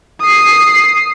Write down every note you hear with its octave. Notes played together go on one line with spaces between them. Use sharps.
D#6 C7